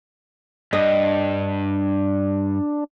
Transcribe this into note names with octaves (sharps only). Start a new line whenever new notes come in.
G2 D4 D#5